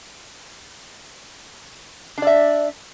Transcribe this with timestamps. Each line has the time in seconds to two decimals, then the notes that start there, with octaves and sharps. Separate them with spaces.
2.18 D4
2.22 D5
2.27 E5